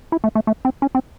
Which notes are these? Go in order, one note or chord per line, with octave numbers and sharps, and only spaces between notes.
E4
A3
A3
A3
C4
C#4
C4